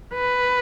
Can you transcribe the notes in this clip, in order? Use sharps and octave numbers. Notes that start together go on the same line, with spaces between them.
B4